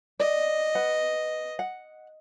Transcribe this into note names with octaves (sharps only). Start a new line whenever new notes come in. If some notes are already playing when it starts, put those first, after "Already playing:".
D5 D#5
B4 F#5
F#5